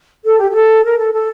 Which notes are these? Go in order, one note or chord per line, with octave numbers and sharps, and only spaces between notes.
A4
G4
G4
A4
A#4
A4
A4